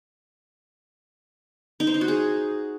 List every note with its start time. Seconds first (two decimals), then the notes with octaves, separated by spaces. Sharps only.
1.80 D#4
1.87 C5
1.94 D#4
2.01 F#4
2.08 G#4